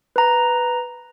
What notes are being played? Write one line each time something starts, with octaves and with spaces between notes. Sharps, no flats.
B4 A#5